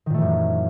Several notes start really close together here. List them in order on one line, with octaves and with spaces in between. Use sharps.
D#3 A#2 A3 E3 F#2